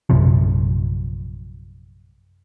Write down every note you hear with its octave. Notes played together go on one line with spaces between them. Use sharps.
A#1 F#2 C3 F3